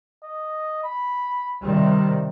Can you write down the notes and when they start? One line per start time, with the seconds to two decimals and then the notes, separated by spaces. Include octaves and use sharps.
0.23 D#5
0.84 B5
1.64 C3 D#3 G3 C4